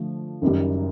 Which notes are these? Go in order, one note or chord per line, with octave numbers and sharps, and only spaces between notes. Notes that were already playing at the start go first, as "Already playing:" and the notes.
Already playing: D3 F3 A3
F#1 F#2 D#3 G3